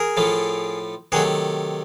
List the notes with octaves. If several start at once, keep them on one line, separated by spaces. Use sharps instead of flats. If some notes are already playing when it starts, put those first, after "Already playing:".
Already playing: G#4 A#4
A2 F3 A3
C3 D#3 F#3 A3 F#4 G#4